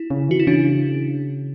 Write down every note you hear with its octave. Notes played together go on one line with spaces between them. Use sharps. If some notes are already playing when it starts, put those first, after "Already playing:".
Already playing: E4
C#3
E3 F#4
E4
C#3 D4